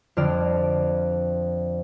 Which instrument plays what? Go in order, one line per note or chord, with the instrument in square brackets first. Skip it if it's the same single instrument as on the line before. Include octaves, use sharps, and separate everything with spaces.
[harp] F2 D3 D5 F6